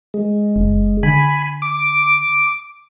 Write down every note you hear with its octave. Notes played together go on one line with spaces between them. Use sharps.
G#3
F#1
D3 G#5 B5
D6